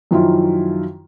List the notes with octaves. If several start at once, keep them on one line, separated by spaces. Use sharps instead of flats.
F#2 D#3 F3 E4 F4